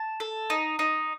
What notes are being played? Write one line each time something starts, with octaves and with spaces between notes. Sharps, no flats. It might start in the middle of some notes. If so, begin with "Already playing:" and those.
Already playing: A5
A4
D#4
D#4